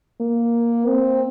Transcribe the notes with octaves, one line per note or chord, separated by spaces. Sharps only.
A#3
C4